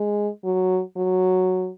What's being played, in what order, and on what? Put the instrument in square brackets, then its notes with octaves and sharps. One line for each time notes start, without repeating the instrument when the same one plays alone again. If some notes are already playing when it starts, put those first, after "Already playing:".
Already playing: [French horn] G#3
F#3
F#3